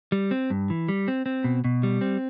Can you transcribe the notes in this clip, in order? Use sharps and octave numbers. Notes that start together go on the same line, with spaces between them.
G3
C4
G2
E3
G3
C4
C4
B2
B2
G3
C4